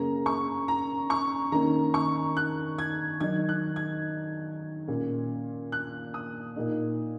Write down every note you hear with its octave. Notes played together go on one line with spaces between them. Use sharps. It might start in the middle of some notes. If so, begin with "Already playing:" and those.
Already playing: F#2 C#3 A#3 C#4 A#5
C#6
A#5
C#6
D#3 A#3 C#4 A#5
C#6
F#6
G#6
D#3 F#3 D#4 G#6
F#6
G#6
A#2 A#3 C#4
F#6
D#6
A#2 A#3 D#4